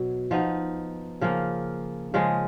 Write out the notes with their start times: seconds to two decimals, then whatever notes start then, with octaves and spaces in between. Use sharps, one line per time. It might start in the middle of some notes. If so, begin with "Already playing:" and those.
Already playing: B2 F#3 B3
0.31 F3 B3 D#4
1.21 C#3 F3 A#3
2.14 C#3 F3 G#3